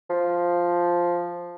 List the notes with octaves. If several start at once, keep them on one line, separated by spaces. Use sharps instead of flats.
F3